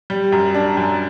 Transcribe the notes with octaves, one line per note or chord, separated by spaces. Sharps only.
G3
F#2
D4
F#2